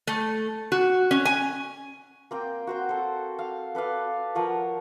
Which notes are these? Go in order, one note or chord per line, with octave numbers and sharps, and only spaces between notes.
A3
F#4
C#4
G#5
A#3 C4 G5
F#4 C5 G5
A4 C5
F5
A4 B4 D5 F5
F3 A#4 C#5 F#5